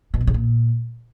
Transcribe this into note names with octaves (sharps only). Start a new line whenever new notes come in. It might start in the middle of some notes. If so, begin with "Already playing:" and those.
B2
F#2
C#3
A#2